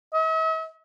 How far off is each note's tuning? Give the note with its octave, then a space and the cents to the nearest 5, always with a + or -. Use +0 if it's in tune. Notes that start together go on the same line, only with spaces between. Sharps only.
E5 -45